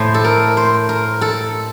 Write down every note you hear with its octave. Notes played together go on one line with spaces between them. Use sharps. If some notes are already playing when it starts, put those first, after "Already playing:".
Already playing: A2 A3 C5
A4
A#4
C5
A#4
A4